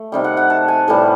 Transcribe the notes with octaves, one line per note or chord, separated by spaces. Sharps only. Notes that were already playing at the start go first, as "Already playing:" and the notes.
Already playing: A3
C3 D#3 G3
F#5
F#5
A5
G#5
A2 E3 G3 A5